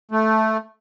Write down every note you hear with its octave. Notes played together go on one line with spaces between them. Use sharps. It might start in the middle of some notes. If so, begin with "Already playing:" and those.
A3